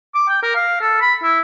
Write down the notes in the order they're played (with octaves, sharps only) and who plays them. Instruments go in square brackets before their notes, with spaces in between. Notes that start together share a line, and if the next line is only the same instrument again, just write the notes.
[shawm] D6
G5
A#4
F5
A4
B5
E4